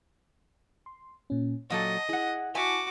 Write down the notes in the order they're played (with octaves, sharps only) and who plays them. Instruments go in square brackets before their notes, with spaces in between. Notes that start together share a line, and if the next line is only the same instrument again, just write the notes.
[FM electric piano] C6
A#2 C#4
[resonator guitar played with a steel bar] A#2 F#3 A4 [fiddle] D#5 [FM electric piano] F#5 A5
[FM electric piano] E4 F#6 [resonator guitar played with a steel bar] G#4 F#5
[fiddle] F#4 D6 [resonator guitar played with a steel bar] E5 G#5 A5